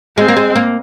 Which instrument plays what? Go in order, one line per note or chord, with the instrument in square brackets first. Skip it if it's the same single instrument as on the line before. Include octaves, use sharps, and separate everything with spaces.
[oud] G#3 [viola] C4
[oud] A#3
G#3
A#3